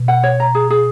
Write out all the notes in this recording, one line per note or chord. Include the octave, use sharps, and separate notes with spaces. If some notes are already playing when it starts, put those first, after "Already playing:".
Already playing: B2
F#5
C#5
A#5
G#4
G#4